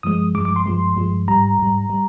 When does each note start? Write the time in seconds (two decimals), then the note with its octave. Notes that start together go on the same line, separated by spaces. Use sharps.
0.03 G2 F3 G#3 D#6
0.34 G2 F3 G#3 D6
0.45 D6
0.56 C6
0.66 G2 F3 G#3
0.97 G2 F3 G#3
1.28 G#2 G3 A#5
1.59 G#2 G3
1.90 G3